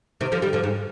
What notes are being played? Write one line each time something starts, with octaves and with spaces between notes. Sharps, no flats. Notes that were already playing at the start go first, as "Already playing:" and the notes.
C3 D#3
D3 F3
D#3 G3
D3 F3
G#2